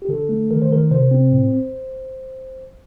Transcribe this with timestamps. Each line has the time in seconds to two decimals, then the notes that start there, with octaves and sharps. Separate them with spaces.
0.02 G4
0.09 D3 A4
0.29 A3
0.51 D#3 A#4
0.62 C5
0.71 D#3 A#4
0.91 C3 C5
1.11 C4
1.32 A2